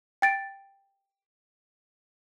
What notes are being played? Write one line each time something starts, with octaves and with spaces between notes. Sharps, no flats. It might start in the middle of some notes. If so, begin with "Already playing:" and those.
G5 A6 D7